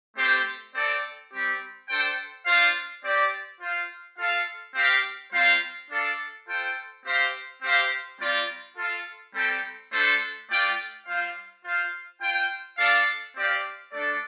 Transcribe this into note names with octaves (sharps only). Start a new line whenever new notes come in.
A3 C4 G4 C5
C4 A4 D5
G3 C4 G4
D4 A4 C5 G5
D4 F4 C5 F5
C4 G4 D5
F4 C5 F5
F4 A4 F5
C4 G4 F5
G3 C4 F4 C5 F5
D4 A4 D5 F5
F4 A4 C5 G5
C4 G4 C5 F5
C4 G4 C5 F5
G3 C4 F4 D5
F4 A4 F5
G3 C4 A4 C5 G5
A3 D4 A4 C5
A3 F4 D5 G5
G3 F4 C5 F5
F4 C5 F5
F4 C5 G5
D4 A4 D5 F5
C4 G4 D5 F5
A3 D4 A4 D5